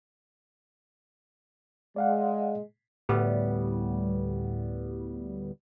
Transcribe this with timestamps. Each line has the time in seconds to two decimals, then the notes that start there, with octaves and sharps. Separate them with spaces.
1.96 G#3 D5 F5 F#5
3.09 D2 A2 G3 B3